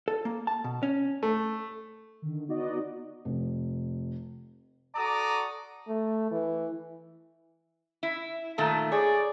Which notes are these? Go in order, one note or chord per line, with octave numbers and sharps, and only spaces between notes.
A4
A#3
A5
B2
C#4
A3
D3 D#3
B3 D#4 F#4 D5 D#5
F1
F#4 A4 D5 A#5 D6 D#6
A3
E3
E4
A#2 D#3 A3 A5
G#4 C#5 D5